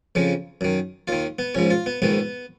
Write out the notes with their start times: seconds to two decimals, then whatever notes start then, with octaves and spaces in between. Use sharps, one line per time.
0.15 F2 C#3 F3
0.61 F#2 D#3
1.08 D#2 D#3 F4
1.39 B3
1.55 A#1 G#2 F3 C#4
1.70 F4
1.86 B3
2.02 A#1 G#2 D#3 B3